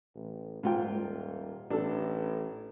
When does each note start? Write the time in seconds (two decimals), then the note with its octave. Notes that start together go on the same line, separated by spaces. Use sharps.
0.15 A1
0.63 D#1 G#2 F4 G5
1.70 A1 D4 A4